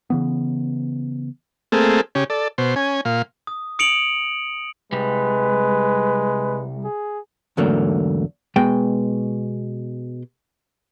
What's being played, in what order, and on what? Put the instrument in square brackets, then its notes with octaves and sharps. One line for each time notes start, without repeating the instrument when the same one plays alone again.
[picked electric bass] C#3 E3 B3
[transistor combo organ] A3 A#3 C4 G#4 A4
C#3 C#4 G4
A4 D5
B2 C5
C#4 G#5
A#2 F5
[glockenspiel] D#6
D#6 C#7 D7 F7 F#7
[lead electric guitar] C2 G3 [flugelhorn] G#3 [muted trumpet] B4
[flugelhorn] G#4
[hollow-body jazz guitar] E2 G#2 D3 F#3 A3 A#3
B2 G#3 G5